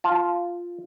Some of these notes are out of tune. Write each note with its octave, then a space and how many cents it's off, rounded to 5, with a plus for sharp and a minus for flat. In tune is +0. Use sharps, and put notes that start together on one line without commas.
F4 +0 A5 -15